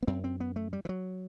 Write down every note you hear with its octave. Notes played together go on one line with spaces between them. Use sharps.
B3
F#2 C4
C4
B3
A3
G3
E3
F#3